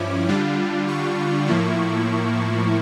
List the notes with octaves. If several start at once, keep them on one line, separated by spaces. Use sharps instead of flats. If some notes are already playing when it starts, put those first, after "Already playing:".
Already playing: G2 F3 C#4 E4 D6
D3 G3 D4 F4
C#6
A2 F3 A#3 E4